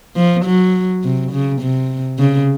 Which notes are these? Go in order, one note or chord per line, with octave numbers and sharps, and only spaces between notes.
F3
F#3
C3
C#3
C3
C#3